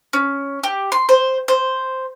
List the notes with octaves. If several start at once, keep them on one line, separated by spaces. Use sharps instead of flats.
C#4
G4
C6
C5
C5